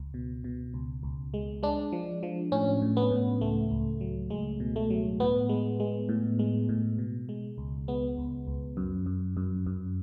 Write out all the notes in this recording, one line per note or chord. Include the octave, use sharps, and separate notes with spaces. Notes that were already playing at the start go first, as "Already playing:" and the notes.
Already playing: C#2
B2
B2
C#2
C#2
G#3
G#3 D4
F3
F3
A2 C#4
A2
B3
A2
C#2 A3
C#2
F#3
C#2 G#3
B2
A3
F#3
A2 B3
G#3
G#3
A2
G#3
A2
B2
G#3
C#2
G#3 B3
C#2
C#2
F#2
F#2
F#2
F#2